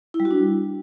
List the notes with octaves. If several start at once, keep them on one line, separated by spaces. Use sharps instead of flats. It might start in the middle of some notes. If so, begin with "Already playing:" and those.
E4
G3
F#4
D4